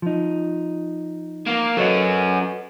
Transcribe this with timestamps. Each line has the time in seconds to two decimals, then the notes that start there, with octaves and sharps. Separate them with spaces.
0.02 F3 D#4
1.47 A#3
1.77 F#3 C#4 A4 B4 D#5